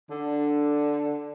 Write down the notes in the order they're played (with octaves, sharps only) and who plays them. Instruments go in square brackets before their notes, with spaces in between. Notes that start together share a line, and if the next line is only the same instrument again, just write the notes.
[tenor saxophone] D3 [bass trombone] D4